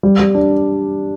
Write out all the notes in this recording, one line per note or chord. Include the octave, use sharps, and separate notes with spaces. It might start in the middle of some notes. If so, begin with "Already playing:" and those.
G3
G3
D4